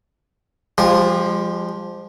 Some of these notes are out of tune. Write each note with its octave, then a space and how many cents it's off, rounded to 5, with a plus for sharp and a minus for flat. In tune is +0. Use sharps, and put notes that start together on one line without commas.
F3 +0 G#3 -40 G4 +0